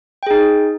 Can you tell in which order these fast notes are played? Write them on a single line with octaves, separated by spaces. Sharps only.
G5 G#4 D#4